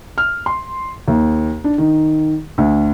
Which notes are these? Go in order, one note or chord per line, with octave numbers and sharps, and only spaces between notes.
F6
C6
D#2
D4
D#3
D2